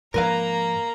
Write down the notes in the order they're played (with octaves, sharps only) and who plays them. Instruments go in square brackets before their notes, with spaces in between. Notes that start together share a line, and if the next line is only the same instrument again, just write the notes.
[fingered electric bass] G#2 F3 [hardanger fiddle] A#3 A#5 [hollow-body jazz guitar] A#4 B4 F5